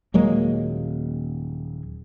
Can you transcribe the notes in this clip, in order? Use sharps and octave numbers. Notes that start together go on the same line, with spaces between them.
D#1 F#3 G#3 A#3